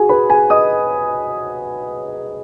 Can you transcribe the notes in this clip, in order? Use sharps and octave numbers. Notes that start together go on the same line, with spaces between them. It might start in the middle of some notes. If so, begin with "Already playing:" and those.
Already playing: F#4 G#4 G#5
B4 B5
G#4 G#5
D#5 D#6